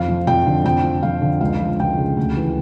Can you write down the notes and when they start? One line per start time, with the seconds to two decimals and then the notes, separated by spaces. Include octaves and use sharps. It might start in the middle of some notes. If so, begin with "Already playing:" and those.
Already playing: F2 F5
0.09 F3
0.27 F2 G5
0.47 D3
0.64 F2 G5
0.83 F3
1.03 F2 F5
1.21 D3
1.41 C#2 F5
1.60 F3
1.79 C#2 G5
1.98 C#3
2.17 D2
2.37 E3